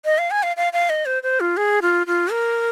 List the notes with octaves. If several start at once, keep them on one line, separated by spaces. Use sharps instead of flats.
D#5
F5
G#5
F5
F5
F5
D#5
C5
C5
F4
G#4
F4
F4
A#4